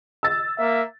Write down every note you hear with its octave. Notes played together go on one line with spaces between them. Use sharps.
E6 A6
A#3 E5